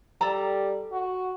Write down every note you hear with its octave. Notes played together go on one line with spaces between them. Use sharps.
G3 A4 A#5
F#4